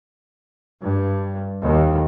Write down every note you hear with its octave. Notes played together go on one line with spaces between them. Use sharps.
G2
D#2